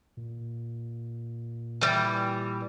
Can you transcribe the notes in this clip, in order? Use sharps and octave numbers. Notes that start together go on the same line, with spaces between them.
A#2
E3 G3